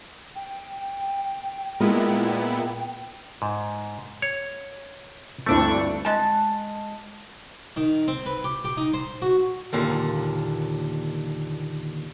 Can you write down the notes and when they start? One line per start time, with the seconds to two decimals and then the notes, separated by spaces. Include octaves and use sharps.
0.36 G5
1.80 A#2 G#3 B3 E4 F4 A#4
3.42 G#2
4.22 C#5
5.46 D2 G2 A3 C4 D4 E4 C#6
6.05 G#3 A5
7.77 D#3
8.08 C4
8.26 B4
8.44 G4
8.64 G4
8.77 D#4
8.94 C5
9.22 F#4
9.73 D#2 A#2 D3